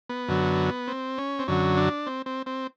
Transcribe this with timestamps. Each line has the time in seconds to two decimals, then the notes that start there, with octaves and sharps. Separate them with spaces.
0.09 B3
0.28 F#2 D3 F#3
0.88 C4
1.18 C#4
1.39 C4
1.48 F#2 D3 F#3 C#4
1.77 D4
2.07 C4
2.26 C4
2.46 C4